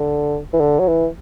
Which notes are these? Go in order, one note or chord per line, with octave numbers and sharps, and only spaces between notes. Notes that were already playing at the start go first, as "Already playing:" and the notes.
Already playing: D3
E3
D3
F#3
E3